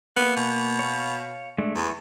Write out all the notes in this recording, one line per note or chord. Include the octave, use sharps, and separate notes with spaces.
A#3 B3
B2
C#5 F5
G#3 A3 D4
E2 E3 C#6